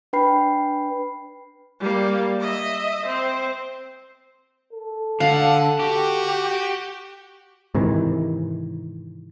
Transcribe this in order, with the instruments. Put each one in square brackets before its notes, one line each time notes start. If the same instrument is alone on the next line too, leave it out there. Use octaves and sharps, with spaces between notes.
[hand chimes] D4 B4 G5 B5 C7
[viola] G3 A#3
D#5 E5
C4
[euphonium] A4
[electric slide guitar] D3 [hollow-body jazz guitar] F5 [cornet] F#5
[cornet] F#4 [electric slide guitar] G4
[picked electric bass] G#2 C3 D#3 E3